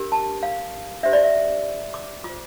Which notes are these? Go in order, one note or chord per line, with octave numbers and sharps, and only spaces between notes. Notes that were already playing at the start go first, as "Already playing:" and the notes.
Already playing: D4 G4 A#4
A5
F5
D4 G4 C5 E5
D5
E5
D6
F4 C5 D6